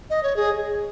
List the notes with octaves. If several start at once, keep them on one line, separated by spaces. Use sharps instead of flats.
D#5
C#5
G#4